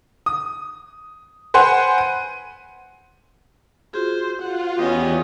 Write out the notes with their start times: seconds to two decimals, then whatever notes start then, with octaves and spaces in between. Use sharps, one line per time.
0.26 D#6
1.54 B4 C5 F#5 G#5 C6
1.98 D#7
3.94 F4 F#4 G#4 C5
4.42 F4 F#4 F#5
4.77 E2 B3 C#4 G4 D#5